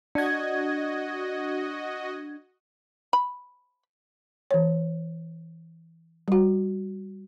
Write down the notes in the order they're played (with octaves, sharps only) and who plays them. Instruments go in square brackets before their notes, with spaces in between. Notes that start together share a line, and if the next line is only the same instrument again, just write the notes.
[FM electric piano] D4 G#6 [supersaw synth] F#4 D#5
[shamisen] B5
[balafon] E3 C#5
G3 F#4